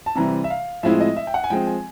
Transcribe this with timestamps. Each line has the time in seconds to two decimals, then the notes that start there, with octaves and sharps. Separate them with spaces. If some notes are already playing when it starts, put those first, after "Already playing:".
0.06 A5
0.15 C3 E3 G3 C4 A#5
0.44 E5
0.50 F5
0.83 A2 F3 G#3 C4 E4 E5
1.00 D#5
1.17 E5
1.27 G5
1.34 F#5
1.44 G#5
1.50 F3 G#3 C4 G5
1.67 G#5